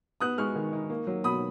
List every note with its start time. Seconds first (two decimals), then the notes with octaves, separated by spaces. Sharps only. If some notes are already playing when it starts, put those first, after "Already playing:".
0.20 B3 D#6 F#6
0.38 G#3 C#6 F6
0.56 D#3
0.73 D#4
0.90 A#3
1.07 F#3
1.24 B2 B5 D#6